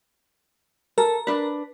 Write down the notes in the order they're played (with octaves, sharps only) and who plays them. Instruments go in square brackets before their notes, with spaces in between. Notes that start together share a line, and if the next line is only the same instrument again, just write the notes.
[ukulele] A4 [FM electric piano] A#4
[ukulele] D4 B4